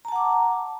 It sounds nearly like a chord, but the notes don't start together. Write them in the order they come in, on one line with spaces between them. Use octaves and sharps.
A#5 A5 F#5 D6